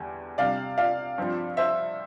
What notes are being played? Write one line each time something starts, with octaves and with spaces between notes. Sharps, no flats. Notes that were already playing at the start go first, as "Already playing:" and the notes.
Already playing: E2 D3 G3
C3 G3 D4 D5 F5
D5 F5
G2 F3 C4
C5 E5